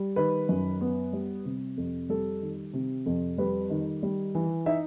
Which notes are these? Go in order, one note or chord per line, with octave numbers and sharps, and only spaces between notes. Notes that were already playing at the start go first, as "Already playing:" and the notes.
Already playing: G3
D#3 B4
F#2
B3
G3
C3
F2
G3 A4
D#3
C3
F2
G3 B4
D#3
G3
E3
D#4 E5